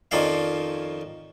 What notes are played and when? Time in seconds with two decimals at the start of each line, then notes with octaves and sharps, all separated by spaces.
0.11 F2 D#3 F3 C#4 D5 F5